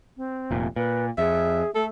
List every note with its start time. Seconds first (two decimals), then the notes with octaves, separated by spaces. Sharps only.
0.17 C4
0.51 F1 A#2
0.76 A#2 B4
1.18 F2 G#4 E5
1.75 A3 A4